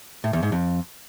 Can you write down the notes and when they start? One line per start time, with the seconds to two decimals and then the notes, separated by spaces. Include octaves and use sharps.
0.24 A2
0.33 E2
0.43 G#2
0.52 F2